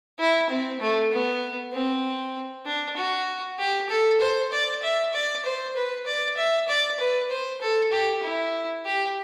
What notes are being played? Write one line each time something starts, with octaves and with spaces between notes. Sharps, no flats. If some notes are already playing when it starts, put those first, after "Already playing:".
E4
C4
A3
B3
C4
D4
F#4
G4
A4
C5
D5
E5
D5
C5
B4
D5
E5
D5
B4
C5
A4
G4
E4
G4